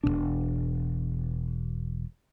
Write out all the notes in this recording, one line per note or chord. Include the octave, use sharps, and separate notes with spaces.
E1 C#2 B2 D4